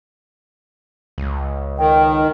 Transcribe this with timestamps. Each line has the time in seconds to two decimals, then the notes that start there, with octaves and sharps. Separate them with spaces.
1.18 C#2
1.78 D#3 G5